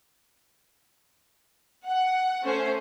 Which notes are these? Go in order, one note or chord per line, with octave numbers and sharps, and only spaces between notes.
F#5
A3 C#4 C5